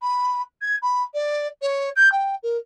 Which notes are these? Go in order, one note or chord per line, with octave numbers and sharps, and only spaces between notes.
B5
G#6
B5
D5
C#5
G6
G5
A#4